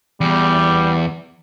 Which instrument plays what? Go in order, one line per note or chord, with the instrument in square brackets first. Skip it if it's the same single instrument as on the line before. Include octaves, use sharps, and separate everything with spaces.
[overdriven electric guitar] E2 [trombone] G3